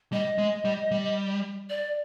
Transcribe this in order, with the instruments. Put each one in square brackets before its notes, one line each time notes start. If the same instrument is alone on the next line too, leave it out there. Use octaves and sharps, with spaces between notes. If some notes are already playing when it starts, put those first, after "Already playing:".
[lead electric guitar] G3 [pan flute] D#5
[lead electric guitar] G#3
G3
G3
[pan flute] D5